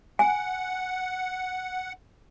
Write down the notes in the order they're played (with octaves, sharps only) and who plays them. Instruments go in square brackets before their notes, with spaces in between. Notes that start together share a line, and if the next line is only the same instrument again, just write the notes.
[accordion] F#5 [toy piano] G#5